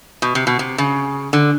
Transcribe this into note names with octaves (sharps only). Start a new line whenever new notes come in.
B2
C3
B2
C3
C#3
D3